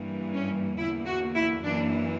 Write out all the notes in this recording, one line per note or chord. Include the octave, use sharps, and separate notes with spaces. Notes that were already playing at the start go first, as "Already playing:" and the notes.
Already playing: G2 E3 A#3
C#4
E2 D3 A#3 E4
F#4
E4
F#2 E3 A#3 D4